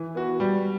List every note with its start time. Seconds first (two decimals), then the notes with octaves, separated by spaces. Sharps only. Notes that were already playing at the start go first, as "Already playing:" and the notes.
Already playing: E3
0.15 B3 F#4
0.40 G3